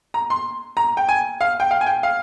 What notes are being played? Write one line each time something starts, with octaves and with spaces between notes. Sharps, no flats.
A#5
C6
A#5
G5
G#5
F5
G5
F5
G#5
G5
F5